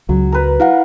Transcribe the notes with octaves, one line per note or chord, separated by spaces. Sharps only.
C#2 F#3
A#4 B4
E4 F5 F#5